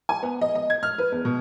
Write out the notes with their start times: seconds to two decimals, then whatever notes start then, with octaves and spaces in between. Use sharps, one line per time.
0.09 G#5
0.23 B3
0.41 D#5
0.55 D#5
0.70 G#6
0.83 F6
0.98 B4
1.12 E2
1.25 B2